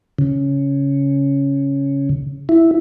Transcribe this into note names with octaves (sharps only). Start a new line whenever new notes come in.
C#3
E4